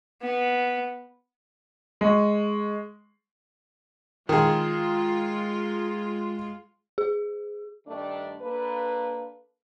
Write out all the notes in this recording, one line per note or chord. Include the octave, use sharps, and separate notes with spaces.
B3
G#3 C#6
D#3 G#3 F4 G#4
G#4
G2 D#3 A3 D4
A#3 D4 A4 B4